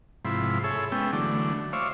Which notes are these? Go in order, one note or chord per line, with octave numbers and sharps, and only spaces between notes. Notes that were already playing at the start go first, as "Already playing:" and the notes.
G#2 C3 F3 E4 B5 C6
G#4 A4 C#5 E5
G#3 B3 C#4 G5 E6
D3 E3 F#3 A3 D4
C5 C#5 E5 F5 C#6 D6